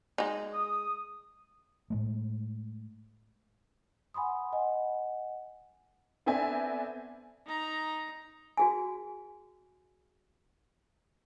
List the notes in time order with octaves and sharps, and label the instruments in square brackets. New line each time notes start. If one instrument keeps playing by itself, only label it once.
[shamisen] G#3 D#4
[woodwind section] D#6
[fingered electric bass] A2 G#3 A3
[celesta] F#5 G#5 B5 C6 D#6
D#5 F#5 G#5
[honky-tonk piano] B3 C4 D4 A4 E5 G#5
[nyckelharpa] D#4 A#5
[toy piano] F#4 G#4 G#5